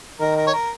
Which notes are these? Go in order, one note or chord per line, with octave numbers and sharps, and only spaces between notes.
D#3 A#4
A#4
C#5
A#4